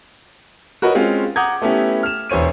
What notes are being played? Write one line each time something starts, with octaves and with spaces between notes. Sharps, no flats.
F#4 A#4 B4 C#5 D#5
G#3 C4 C#4 F4
F#5 A#5 D6 D#6 G6 G#6
A3 B3 C#4 E4 G4
F6 E7
E1 E3 C5 C#5 D#7